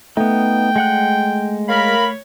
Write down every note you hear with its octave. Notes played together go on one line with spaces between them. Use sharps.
A3 B3 D#4 G5
G#3 F#5 F#6
A#4 C#5 F5 B5